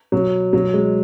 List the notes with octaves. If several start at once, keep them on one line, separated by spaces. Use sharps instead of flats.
B2 F#3
B2 F#3
G#3